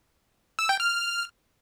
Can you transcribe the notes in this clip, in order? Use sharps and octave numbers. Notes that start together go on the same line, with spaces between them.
E6
G5
F6